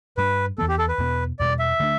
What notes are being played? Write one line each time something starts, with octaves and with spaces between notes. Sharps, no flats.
G2 G3 D4 B4
E2 E3 B3 A4
G4
A4
B4
E2 B2 B3
E2 B2 G3 D5
E5
D3 A3 D4